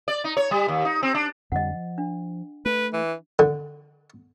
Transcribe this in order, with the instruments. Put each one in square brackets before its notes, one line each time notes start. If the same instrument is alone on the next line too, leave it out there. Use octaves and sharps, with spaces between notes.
[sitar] D5
D#4
C#5
G3
D#2
D#4
C4
D4
[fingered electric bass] F2 D3 G3 [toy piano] D#5 F#5
[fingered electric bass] F3
[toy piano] D4
[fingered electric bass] A3 [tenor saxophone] B4
[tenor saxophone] E3
[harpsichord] D3